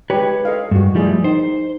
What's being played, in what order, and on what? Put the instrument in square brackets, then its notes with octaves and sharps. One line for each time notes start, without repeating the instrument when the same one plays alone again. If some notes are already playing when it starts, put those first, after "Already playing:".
[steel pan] G#3 G4 [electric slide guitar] B4 C#5
[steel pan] A4 D#5 F5
[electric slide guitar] G2 [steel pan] G#3 F#4
[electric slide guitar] F3 G3 A3 [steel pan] E4 G#4 D5
[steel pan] D#4 [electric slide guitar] C5